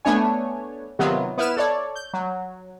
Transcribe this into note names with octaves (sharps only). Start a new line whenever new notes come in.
A3 B3 D4 C#5 G#5
C3 D#3 F#3 B3 F4
B3 E4 B4 F6 E7
A4 C#5 D5
G6
F#3